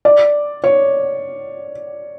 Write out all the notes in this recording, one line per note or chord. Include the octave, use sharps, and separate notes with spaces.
D5
C#5